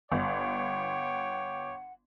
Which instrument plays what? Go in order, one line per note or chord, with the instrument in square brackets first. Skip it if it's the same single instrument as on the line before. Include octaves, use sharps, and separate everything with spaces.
[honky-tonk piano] G1 [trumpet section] C#5 G5 D6 [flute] F#5